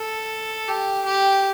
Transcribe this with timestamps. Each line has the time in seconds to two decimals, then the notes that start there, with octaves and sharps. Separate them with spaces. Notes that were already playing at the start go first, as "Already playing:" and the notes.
Already playing: A4
0.68 G4
1.06 G4